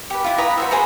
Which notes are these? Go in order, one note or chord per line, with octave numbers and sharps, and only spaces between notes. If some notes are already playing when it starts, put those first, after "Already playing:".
G4 B4
E4 F4
E4 B4 A#5 D#6
F#4 C5 E5
G#4 B4 C5 A#5